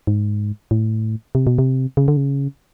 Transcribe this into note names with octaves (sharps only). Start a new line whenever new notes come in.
G#2
A2
C3
B2
C3
C#3
D3
C#3